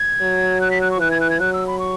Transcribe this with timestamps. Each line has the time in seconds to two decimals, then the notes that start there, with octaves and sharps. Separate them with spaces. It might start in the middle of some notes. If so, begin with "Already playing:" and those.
Already playing: G#6
0.21 F#3
0.61 F#6
0.71 B6
0.81 F#6
0.91 C#6
1.00 E3 F#6
1.11 G#6
1.20 F#6
1.30 G#6
1.40 F#3 F#6
1.53 E6
1.67 B5
1.79 C#6